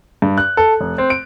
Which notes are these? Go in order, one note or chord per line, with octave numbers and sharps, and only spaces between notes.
G2
F#6
A4
F1
C4
D7